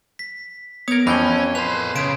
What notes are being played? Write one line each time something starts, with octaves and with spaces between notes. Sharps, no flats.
B6
B3 A#4 C#5 D#6 G#6
F2 E3 F3 C#4 B5 G#6 G7
B4 C5 F#6 C7 F7
C#3 B6 D7 E7